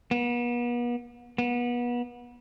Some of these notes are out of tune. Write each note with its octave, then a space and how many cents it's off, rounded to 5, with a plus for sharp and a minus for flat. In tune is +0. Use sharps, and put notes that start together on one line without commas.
B3 -40
B3 -30